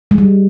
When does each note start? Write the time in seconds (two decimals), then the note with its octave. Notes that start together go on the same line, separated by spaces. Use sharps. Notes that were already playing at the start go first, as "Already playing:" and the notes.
0.11 G#3
0.18 G3